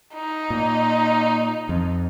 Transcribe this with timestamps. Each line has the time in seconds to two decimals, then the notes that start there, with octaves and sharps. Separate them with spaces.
0.15 D#4
0.50 A#2
1.69 F2